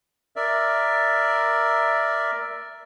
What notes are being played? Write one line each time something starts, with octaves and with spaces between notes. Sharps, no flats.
A#4 D5 E5